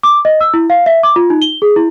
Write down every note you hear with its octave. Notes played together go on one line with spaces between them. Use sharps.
D6
D#5
E6
E4
F5
E5
D6
F4
D#4
G7
G#4
E4